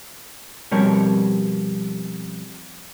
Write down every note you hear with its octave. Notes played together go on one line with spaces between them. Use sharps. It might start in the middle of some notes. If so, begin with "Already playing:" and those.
F2 B2 G3 A#4 C#5